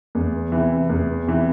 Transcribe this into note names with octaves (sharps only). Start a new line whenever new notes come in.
E2
C3 E3
E2
C3 E3